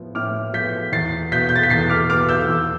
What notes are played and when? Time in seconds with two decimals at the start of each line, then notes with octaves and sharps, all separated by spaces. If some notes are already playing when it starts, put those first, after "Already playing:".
Already playing: A2 F3 B3
0.15 A2 D6 F6
0.53 F3 B3 G6 B6
0.92 E2 A6 C7
1.32 B2 B3 G6 B6
1.49 G6
1.56 A6
1.63 B6
1.70 E2 A6 C7
1.90 D6 F6
2.09 B2 B3 D6 F6
2.29 E6 G6
2.49 E2